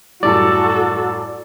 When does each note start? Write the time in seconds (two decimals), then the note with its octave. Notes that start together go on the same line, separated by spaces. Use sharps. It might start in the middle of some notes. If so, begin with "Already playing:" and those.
0.23 F#2 A2 G3 F#4 A4 D5